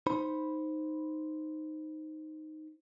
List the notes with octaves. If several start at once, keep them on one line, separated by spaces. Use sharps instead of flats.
D#4 C5 B5